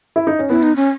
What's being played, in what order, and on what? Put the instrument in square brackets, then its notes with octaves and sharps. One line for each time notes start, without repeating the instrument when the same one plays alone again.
[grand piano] E4
D#4
C#4
[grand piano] B3 [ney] E4
[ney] D#4
C#4